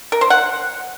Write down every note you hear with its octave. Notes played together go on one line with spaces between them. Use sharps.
A#4
C5
F#5